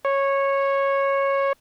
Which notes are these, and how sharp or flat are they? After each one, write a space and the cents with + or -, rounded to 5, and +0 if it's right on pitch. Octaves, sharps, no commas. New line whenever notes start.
C#5 -10